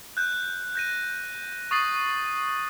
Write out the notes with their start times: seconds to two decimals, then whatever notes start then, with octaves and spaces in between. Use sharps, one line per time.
0.17 F#6 G6
0.75 G6 A#6 D#7
1.71 C#6 D#6 A6 C7 F#7